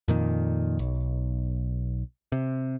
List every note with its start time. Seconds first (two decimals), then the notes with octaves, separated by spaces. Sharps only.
0.08 F2 A#2 D#3
0.79 B1
2.32 C3